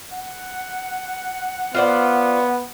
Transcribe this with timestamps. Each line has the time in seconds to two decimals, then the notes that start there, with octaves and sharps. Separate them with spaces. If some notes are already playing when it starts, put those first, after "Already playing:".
0.13 F#5
1.74 B3 F4 C5 D5